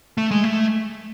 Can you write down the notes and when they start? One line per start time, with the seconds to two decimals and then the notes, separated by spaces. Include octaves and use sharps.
0.18 A3
0.31 G#3
0.44 A3